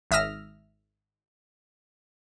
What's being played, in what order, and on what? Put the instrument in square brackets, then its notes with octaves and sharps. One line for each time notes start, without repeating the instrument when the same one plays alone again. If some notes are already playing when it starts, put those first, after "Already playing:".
[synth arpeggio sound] G#1 E5 D#6 F6 A#6